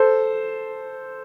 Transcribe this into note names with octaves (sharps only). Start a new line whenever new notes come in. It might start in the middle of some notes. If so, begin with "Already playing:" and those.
Already playing: A4 C5